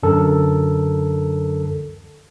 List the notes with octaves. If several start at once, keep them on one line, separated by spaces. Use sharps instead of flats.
F#2 D3 A4 A#4